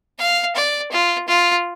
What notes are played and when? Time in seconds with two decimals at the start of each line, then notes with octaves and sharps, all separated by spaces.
0.19 F5
0.56 D5
0.92 F4
1.28 F4